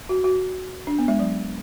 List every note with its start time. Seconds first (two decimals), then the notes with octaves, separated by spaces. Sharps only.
0.09 F#4
0.24 F#4
0.87 D4
0.99 B3
1.08 G#3
1.19 F#3